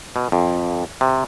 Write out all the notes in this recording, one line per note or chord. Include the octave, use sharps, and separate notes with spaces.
B2
F2
C3